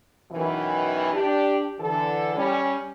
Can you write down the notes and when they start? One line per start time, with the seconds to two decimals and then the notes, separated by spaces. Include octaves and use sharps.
0.31 F#2 B2 D#3 E3
1.12 D4 G4
1.79 D3 E3 A4
2.35 G3 C#4